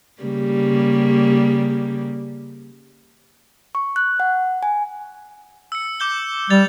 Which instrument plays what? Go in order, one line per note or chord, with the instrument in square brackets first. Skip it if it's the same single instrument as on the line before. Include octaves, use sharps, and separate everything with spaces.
[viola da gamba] C#3 G3 A#3
[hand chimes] C#6
F#6
F#5
G#5
[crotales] E6 C#7
D6 G6 G7
[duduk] G3 [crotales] G6 A6 F7